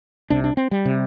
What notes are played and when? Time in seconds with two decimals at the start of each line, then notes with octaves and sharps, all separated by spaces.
0.30 C2 C3 D4
0.44 D4
0.57 C4
0.71 G3
0.85 C3